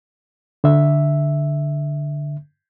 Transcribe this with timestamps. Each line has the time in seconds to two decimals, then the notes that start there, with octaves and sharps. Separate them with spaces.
0.64 D3 E5